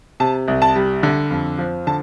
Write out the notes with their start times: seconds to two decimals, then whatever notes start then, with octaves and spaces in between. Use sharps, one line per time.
0.20 C3 A5
0.48 C2
0.62 A5
0.76 G3
1.03 D3
1.31 F2
1.58 F3
1.87 D3 A5